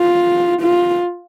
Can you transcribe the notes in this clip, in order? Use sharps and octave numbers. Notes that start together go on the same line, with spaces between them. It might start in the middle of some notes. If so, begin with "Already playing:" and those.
Already playing: F4
F4